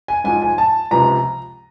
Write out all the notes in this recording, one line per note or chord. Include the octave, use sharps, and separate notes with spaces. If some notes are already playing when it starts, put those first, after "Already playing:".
G#5
G#2 F3 G#5
G#5
A5
C#2 C3 F3 A#5